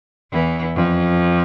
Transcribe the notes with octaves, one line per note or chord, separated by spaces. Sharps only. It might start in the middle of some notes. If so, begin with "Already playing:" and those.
E2 E3
F2 F3